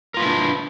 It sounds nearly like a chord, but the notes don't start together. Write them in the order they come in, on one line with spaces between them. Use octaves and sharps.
A#4 F4 B4 E4 D4